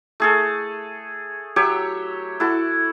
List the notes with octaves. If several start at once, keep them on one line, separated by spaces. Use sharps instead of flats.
A3 G#4 A4
F#3 G4 C#5 E5
E4 F#4 A4